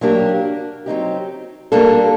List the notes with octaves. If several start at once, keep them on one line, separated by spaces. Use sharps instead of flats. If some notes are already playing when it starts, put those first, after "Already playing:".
F#3 A#3 D4 G4
F#3 C4 D#4 G4
G3 A#3 D4 A4